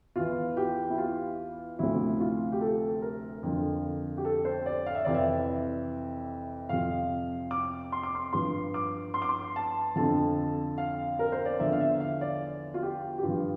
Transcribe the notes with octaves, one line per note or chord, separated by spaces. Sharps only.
E2 E3 F4
G4
E4
F4
D2 C3 F3 E4
F4
G4
A4
A#4
F2 D3 F3
G4
A4
C5
D5
F5
E5
F2 C3 E3 D5
E5
F2 C3 F3 F5
D6
C6
D6
C6
G2 F3 C6
D6
C6
D6
C6
A5
F2 D3 F3 A5
F5
A#4
C5
D5
E2 D3 F3 E5
F5
E5
F5
D5
F4
G4
G4
G2 F3 F4